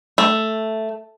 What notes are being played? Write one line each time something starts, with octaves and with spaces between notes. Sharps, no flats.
A3